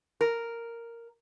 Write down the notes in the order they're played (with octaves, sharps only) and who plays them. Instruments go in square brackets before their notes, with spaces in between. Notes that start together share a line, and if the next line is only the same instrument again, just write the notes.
[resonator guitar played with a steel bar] A#4